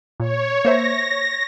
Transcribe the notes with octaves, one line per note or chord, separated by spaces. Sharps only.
A#2 C#5
A#3 C5 E5 A#6